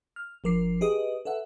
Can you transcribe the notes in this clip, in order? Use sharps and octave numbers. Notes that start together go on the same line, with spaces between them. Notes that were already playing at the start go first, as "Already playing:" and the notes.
F6
G1 F3 A#4 D6 C7
G4 G#4 B4 D#5 D#6
A4 B4 E5 F#5